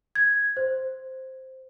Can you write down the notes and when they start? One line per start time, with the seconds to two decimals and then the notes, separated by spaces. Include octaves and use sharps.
0.15 G#6
0.57 C5